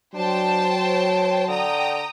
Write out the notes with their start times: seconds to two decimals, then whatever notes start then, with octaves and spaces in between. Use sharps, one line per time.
0.15 F#3 D4 C5 G5 A5
0.77 C#5
1.49 D3 G5 A#5 D#6